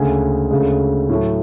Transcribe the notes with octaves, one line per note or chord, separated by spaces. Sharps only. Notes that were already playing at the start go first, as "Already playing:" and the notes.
Already playing: D2 C#3 G#3 G#5
D2 C#3 G#3
A2 F#3 A3